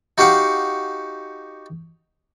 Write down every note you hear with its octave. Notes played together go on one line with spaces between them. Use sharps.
D#4 F#4 G4 F5 F#5